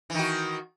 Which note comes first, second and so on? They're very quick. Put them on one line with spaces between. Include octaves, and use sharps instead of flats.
E3 D#3 F#4